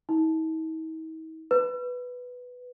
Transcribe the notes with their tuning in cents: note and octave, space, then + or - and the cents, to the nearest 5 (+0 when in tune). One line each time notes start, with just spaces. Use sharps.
D#4 +45
B4 +5